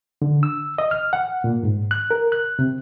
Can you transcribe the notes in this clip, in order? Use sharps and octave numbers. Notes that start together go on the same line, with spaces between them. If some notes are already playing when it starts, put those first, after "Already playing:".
D3
E6
D#5
F6
F#5
A#2
G#2
F#6
A#4
F#6
C3